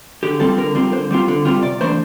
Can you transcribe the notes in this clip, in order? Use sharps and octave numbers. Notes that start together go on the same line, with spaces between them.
D3 G4
G3 C4 F4 A4
D3 A#4
G3 C4 F4
D3 C5
G3 C4 F4
D3
G3 C4 F4
C3 D5
E3 A3 D4 C5